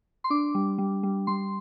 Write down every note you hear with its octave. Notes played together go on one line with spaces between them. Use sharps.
C6
D4 D6
G3
G3
G3
G3 C6